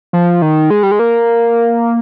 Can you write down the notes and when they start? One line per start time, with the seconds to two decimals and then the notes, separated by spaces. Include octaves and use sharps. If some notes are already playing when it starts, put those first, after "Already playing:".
0.13 F3
0.42 D#3
0.70 G#3
0.83 G3
0.91 G#3
0.99 A#3